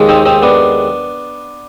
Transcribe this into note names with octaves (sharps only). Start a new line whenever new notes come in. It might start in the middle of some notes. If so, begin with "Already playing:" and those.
Already playing: D#2 D#3 G#3
C4 D#4
C4 D#4
B3 D4